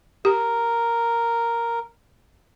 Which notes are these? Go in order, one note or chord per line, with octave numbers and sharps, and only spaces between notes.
G4 A#4